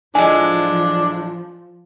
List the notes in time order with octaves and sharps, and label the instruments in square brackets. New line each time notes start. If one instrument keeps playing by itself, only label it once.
[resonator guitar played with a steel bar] A2 G#3 [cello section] F3 [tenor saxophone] D4 [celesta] G#5